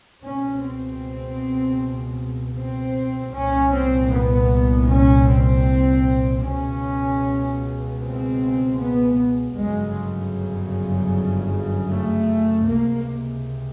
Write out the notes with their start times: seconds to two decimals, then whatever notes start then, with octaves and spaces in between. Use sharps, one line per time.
0.23 C#2 B2 C#4
0.63 C4
2.57 C4
3.35 C2 A#2 C#4
3.73 C4
4.12 B3
4.90 C#4
5.28 C4
6.44 C#2 B2 C#4
8.01 C4
8.77 B3
9.55 G1 F#2 C#3 G#3
11.89 A3
12.66 C#2 C3 A#3